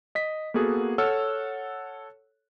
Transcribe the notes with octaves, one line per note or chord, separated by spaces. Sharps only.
D#5 B6
A#3 B3 F#4 G#4 A4
A4 C#5 F#5 E6 F6